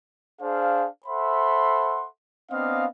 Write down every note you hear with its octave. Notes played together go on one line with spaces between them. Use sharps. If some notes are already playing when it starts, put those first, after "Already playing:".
D4 G#4 C5 F5
A4 C5 E5 F#5 B5 C6
B3 C4 D4 D#5 F5